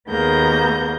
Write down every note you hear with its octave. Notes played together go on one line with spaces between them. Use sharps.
D#2 A#3 B3 G#4 A#5 G6